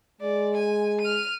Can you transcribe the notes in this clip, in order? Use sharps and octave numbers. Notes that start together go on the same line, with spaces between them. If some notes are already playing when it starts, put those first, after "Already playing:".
G#3 D5
G#5
F6 D#7